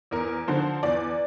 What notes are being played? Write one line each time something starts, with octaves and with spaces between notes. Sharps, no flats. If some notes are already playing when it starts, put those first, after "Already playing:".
E2 A#4
D3 F3 C5
E2 D5